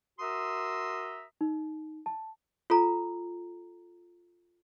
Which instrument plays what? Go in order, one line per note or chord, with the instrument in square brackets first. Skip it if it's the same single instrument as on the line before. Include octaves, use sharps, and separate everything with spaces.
[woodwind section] F#4 A#4 E5 A#5 C6 D#6
[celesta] D#4
A5
[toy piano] F4 A4 A#5